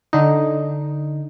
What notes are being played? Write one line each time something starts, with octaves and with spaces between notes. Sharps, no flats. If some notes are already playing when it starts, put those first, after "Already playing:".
D3 D#4